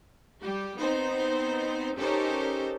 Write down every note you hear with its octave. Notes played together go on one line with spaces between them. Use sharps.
G3 G4
B3 C4 D#4 C5
C#4 D#4 G4 A4 A#4 C5